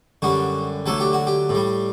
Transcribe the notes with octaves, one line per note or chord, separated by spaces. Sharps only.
F#2 D3 G3 F#4
D2 D3 F#3 A4
G4
F#4
G4
A2
G3